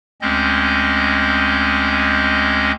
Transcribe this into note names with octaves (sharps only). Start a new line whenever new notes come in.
D2 G#3 C4 C#4 D#5 G6